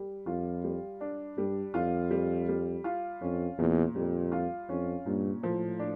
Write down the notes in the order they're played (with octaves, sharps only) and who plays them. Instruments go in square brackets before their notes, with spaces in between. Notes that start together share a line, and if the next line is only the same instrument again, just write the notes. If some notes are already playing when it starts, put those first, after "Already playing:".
Already playing: [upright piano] G3
[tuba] F2 [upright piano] F4
[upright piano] G3
D4
[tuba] G2 [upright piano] G3
[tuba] F2 [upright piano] F4
[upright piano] G3
G3
F4
[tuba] F2 [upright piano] C#4
[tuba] E2 [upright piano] A#2
[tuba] F2 [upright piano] G3
[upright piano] F4
[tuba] F2 [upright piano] C#4
[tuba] G2 [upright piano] A#2
[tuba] A2 [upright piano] F3
[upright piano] D4